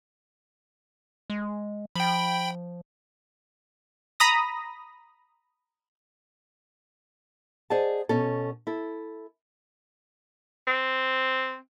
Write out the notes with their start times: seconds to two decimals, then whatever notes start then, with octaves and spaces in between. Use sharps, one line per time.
1.30 G#3
1.96 F3 G5 B5
4.20 A#5 B5 D#6 A#6
7.70 G#4 C5 D5 D#5 F#5 A5
8.09 B2 C#4 A4
8.67 E4 A4
10.67 C4